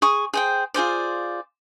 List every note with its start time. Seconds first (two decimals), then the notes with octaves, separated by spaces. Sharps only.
0.02 G#4 C#6 D#6
0.34 G#4 C5 G5
0.74 F4 G#4 C5 D5